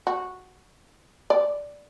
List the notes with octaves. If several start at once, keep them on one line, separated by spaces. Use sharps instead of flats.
F#4
D5